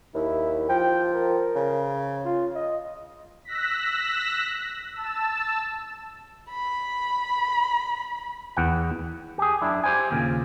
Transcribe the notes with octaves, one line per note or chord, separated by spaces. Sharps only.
D#2 E4
F3 G5
A#4
C#3
F4
D#5
E6 F#6 A#6 B6
A5 E6
B5
E2 F#5 G5
G4 G#4
F#2 D4 E4
G4 C5 G#5
D#2 A#2 C#3